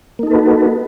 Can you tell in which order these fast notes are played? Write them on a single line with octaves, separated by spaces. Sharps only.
A#3 D#4 A4 B4 F#4